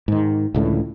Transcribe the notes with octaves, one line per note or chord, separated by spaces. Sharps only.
G#2 D#3
C#2 A2 D3 E3